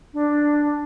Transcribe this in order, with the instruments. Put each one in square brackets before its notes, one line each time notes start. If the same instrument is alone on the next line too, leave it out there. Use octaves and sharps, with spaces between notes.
[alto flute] D4